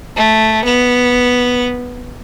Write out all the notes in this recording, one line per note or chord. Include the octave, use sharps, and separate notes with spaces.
A3
B3